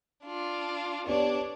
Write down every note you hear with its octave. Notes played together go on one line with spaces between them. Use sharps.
D4 F4
B3 D4 G4 C#5 D5